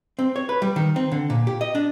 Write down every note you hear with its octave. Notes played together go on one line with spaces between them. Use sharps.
C4
C#5
B4
G3
D#3
C4
D3
A#2
G4
D#5
D4